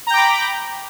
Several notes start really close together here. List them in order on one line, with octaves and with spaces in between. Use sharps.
A#5 G5 D6 B5